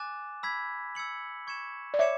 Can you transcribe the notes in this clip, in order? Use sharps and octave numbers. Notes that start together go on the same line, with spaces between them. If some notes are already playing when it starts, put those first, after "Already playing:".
Already playing: G#5 D6 F#6 A6 E7
B5 E6 G#6 B6
E6 G#6 C#7 F#7
C#6 G#6 C#7 E7
D5
C#5 E5 D6 G#6 C#7 E7